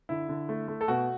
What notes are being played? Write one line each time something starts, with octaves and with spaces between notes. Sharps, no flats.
D3 E4
D3
A3
A3
A4
B2 F#4